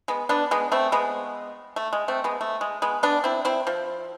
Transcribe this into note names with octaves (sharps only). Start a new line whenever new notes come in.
G#3 B3
B3 D4
G#3 B3
A3 C4
G#3 B3
A3
G#3
A3 C4
G#3 B3
A3
G#3
G#3 B3
B3 D4
C4 E4
C4 E4
F3